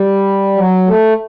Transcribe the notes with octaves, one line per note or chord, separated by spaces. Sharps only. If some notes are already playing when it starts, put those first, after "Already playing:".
Already playing: G3
F#3
A3